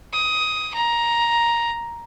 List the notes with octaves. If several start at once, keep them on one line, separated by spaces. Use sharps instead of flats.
D#6
A#5